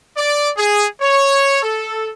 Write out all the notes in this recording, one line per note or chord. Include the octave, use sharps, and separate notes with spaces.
D5
G#4
C#5
A4